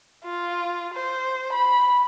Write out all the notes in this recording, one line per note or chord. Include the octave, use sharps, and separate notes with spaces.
F4
C5
B5